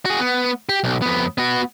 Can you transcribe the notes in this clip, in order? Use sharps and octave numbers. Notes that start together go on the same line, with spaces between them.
F#4 G#4
B3
G4
B1
F2 B3
B3 F#4